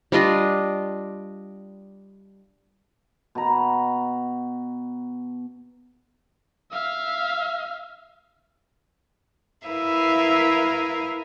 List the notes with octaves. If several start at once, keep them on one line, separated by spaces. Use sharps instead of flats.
G3 D4 F4 D#5
B2 A#5
E5 F5
E4 A#4 B4 E5 F5 D#6